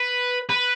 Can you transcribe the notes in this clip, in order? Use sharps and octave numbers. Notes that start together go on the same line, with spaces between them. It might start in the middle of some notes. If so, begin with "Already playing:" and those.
Already playing: B4
B4